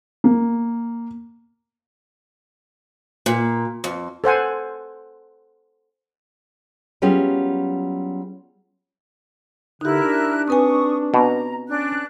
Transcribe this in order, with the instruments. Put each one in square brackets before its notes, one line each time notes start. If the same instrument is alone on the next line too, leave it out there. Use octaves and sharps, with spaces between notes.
[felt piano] A#3
[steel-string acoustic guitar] A#2
F2
[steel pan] A4 C5 F#5 G#5
[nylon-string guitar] F#3 G3 B3 C#4 F4 G#4
[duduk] D3 [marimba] D#4 G4 [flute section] E4 A#4 F#6
[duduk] D4
[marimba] C4 B4 G#5 [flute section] C#6 D#6
[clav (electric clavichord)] B2 [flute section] A#5
[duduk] C#4 [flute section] D4 F#6